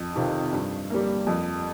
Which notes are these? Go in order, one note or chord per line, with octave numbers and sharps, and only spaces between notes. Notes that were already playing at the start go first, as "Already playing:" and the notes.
Already playing: F2
C3 D#3 C4 F4
G2
G3 A#3
F2